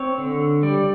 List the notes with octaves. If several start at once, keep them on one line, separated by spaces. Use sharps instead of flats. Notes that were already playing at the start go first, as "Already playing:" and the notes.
Already playing: C4 C#5
D3
G3 D5